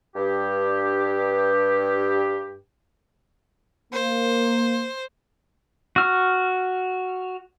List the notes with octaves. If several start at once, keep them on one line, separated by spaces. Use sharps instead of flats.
G2 G4
A#3 C5
F#4 F6